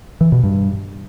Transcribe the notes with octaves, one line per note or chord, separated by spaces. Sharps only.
E3
B2
G2